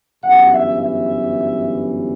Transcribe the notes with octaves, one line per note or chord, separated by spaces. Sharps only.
G1 F#2 E3 F#5
E5
E5